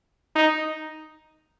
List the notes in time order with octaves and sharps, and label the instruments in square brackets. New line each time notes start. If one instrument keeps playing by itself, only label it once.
[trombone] D#4